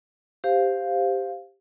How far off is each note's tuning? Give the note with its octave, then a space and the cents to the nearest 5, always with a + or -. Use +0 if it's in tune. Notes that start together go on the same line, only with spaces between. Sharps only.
G4 +5 C5 +0 F5 +0